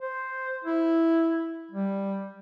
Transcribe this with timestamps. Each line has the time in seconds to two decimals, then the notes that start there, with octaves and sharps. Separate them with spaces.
0.01 C5
0.65 E4
1.71 G3